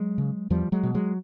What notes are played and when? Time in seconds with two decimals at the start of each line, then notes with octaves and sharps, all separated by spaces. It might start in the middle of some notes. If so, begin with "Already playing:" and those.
Already playing: F#3 G#3
0.18 C#3
0.50 E2 F3 G3
0.72 F#3 G#3
0.83 B2
0.94 F#3 G#3